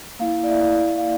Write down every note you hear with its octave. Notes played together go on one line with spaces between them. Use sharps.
A#3 E4 F5
D5
E5
E5
F5